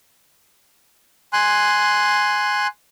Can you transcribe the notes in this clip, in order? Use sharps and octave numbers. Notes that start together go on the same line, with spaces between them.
G#5 C6 F#6